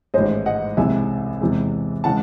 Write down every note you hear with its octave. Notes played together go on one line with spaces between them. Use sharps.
A1 G#2 D#3 G#3 C5 D#5
D#5 F#5
C2 C3 E3 G#3 E5 G#5
E2 C3 E3 G#3
C#3 E3 G#3 F#5 A5